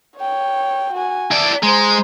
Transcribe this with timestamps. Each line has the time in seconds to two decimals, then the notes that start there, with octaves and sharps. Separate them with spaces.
0.19 C#5 G5
0.93 F#4 G#5
1.31 E4 D5 A5
1.63 G#3 C5 A#5